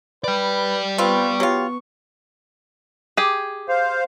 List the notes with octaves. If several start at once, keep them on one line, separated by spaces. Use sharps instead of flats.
B4 D5 G5
B3 C4 F4 B4 C#6
F#3 F4 G4
G4 G#4
C5 F5